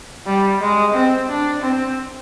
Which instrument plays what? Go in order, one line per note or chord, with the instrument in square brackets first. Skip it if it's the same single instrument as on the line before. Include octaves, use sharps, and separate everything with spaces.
[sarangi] G3
G#3
C4
D4
C4